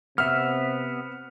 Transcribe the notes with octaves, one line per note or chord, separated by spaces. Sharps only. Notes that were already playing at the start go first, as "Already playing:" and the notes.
C3 B3 E5 F6